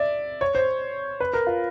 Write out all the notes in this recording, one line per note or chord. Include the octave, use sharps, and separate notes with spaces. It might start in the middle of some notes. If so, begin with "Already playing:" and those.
Already playing: D5 E5
C#5
C5
B4
A#4
F4